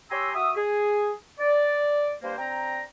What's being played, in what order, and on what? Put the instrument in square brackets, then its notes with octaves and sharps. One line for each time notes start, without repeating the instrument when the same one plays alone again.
[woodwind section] G4 C#5 G#5 A#5 C6 E6
F#4 E5 D#6
G#4
D5
G2 A#3 C5
C4 D4 G5 A#5